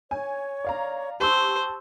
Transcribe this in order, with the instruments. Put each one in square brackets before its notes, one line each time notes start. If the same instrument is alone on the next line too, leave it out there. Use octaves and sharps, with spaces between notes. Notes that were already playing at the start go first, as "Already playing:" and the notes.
[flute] C#5 [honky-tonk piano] G#5
[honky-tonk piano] D5 F5 A#5
[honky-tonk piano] G4 C#6 E6 [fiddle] C5 [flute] A5